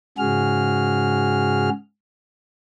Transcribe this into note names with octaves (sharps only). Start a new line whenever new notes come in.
G#2 C#3 F#4 G#4 F6